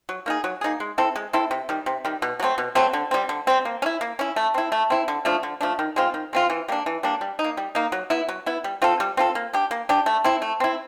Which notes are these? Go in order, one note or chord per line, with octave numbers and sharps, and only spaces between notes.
F#3
A#3 D#4 G#4
F#3
A#3 D#4 G#4
G#3
C4 E4 A4
G#3
C4 E4 A4
C3
D#3 G3
C3
D#3 G3
B2
F#3 A3 C4
B2
F#3 A3 C4
D3
G3 C4
D3
G3 C4
A#3
C#4
E4
A#3
C#4 E4
A3
C4 E4
A3
C4 E4
D3
F3 A3 D4
D3
F3 A3 D4
D#3
G#3 C4 F4
D#3
G#3 C4 F4
E3
G3 A#3 D4
E3
G3 A#3 D4
G3
D#4
A#3
G3
A#3 D#4
F#3
B3 E4
F#3
B3 E4
G3
C4 F4 A4
G3
C4 F4 A4
A#3
D4 G4
A#3
D4 G4
A3
C4 E4
A3
C4 E4